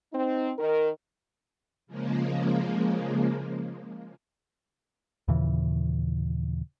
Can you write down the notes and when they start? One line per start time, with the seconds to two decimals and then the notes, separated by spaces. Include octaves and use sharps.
0.13 C4 D#4
0.59 D#3 A#4
1.87 C#3 F3 G#3 A#3
5.28 D#2 A#2 C#3 E3